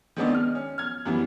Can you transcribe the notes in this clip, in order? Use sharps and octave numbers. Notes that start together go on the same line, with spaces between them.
D#3 G#3 B3 C4 D4 D#4
F6
C#4
F6 G#6
F#2 E3 G3 B3 E4